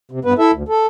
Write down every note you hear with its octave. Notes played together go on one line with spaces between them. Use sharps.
C3
G2 B3 B4
E4 A4 E5
D2
A4